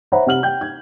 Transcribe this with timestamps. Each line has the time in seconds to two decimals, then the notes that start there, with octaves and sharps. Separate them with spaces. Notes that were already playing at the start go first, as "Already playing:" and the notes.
0.12 C5 C#5 E5 F#5 A#5 B5
0.26 C3 F#5 F6 F#7
0.43 G5 G6
0.61 G#6